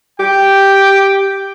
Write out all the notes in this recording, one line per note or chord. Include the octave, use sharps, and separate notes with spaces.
G4 G5